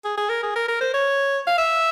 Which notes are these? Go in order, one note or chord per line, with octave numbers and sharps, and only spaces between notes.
G#4
G#4
A#4
G#4
A#4
A#4
C5
C#5
F5
E5